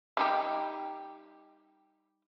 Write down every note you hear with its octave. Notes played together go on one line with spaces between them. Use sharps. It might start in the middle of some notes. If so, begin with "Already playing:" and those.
G3 D#4 G4